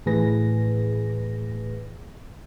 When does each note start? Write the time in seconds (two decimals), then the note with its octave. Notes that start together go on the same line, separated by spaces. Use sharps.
0.06 A2 E3 G#4 B4 A#6